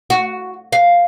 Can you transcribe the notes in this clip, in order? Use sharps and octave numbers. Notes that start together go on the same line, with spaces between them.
F#4
F5